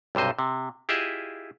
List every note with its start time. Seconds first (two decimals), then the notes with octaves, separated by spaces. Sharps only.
0.15 B1 G2 C3 C5 D#5
0.39 C3
0.89 E4 F4 G4 G#4 D#5 E5